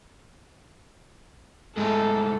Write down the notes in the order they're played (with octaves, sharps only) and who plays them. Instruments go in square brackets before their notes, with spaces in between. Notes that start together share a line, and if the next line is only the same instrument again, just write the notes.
[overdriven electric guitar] G#2 A3 [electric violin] A4